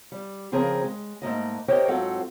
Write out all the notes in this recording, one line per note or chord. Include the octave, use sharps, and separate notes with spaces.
G3
C#3 F3 C4 G#4 A#4 A#5
G#3
G#2 A3 A#3 D#5
G4 A#4 C5 C#5 D#5 G5
G#2 F#3 C4 F4 A4 F#5